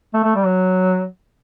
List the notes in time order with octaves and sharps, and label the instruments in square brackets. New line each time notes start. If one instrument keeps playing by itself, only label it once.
[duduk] A3
A3
G3
F#3